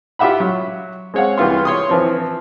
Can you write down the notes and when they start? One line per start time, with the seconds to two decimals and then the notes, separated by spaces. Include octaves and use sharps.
0.19 F4 G4 E5 F#5 B5
0.40 F#3
1.14 G#3 C4 C#5 F5 F#5
1.38 C2 E3 F4 C6
1.65 C#5 C6 D#6
1.89 E3 F3 C4